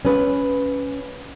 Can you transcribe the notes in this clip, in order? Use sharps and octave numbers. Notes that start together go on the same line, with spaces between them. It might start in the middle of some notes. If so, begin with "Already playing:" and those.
C#4 B4